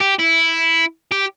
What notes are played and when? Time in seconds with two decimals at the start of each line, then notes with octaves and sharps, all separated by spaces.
0.01 G4
0.19 E4
1.12 G4